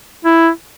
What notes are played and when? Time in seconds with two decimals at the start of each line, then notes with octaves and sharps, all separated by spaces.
0.25 E4